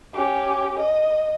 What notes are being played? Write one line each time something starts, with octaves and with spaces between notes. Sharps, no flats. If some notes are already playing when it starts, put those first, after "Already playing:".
C#4 G4
D#5